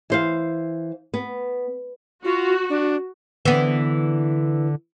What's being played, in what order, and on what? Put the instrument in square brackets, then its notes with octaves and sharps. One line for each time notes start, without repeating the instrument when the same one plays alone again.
[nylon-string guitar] E3 C5 F5
B3
[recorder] F4 [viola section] F#4
[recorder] D4
[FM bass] D3 [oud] E3 B3